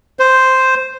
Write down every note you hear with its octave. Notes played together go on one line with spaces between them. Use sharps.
C5